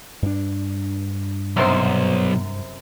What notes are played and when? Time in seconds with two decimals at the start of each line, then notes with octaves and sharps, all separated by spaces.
0.22 G2 D4
1.57 B1 F#2 C3 C5